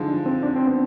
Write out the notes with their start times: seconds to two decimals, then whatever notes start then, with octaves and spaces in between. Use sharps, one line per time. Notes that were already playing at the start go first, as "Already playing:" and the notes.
Already playing: D3 F3 G#3 D#4 F4
0.09 D4
0.26 C4
0.43 D4
0.56 C4
0.67 B3